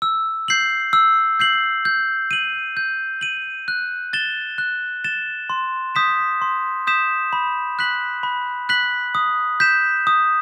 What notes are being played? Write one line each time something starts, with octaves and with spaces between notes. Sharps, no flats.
E6
G6 C7 F#7
E6
G6 C7 F#7
G6
D#7 F#7
G6
D#7 F#7
F#6
A6 E7 G7
F#6
A6 E7 G7
C6
D#6 G6 B6 E7
C6
D#6 G6 B6 E7
B5
F#6 B6 F#7
B5
F#6 B6 F#7
D#6
G6 B6 E7
D#6